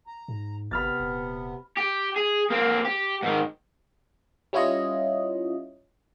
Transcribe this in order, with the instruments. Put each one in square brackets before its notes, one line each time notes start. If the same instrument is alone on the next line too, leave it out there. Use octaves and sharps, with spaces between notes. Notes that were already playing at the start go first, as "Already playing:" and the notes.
[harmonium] A#5
[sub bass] G#2
[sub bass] G1 [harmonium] C3 B3 [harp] B5 F6 A6
[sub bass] D#1
[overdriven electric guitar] G4
G#4
A#3 C4
G4
G#2 D#3
[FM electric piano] G3 C#4 E4 F4 C#5 D#5